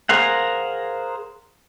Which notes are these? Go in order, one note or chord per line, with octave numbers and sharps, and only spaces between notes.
G#4 A#4 C5 F5 F#5